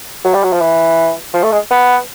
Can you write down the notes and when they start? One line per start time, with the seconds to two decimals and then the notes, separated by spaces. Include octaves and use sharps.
0.24 F#3
0.34 G3
0.43 F#3
0.52 F3
0.61 E3
1.33 F3
1.43 A3
1.51 G#3
1.71 B3